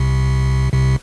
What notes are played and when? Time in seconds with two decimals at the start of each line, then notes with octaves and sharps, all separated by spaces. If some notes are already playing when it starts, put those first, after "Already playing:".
Already playing: C2 C3
0.73 C2 C3